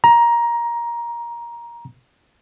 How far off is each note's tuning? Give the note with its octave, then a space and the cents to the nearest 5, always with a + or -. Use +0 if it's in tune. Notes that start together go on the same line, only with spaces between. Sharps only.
A#5 +15